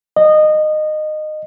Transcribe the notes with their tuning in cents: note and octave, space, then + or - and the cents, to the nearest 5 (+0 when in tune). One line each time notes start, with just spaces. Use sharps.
D#5 -20